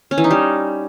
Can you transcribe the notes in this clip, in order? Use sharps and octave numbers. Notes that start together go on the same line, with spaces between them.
C#4
E3
D#4
G3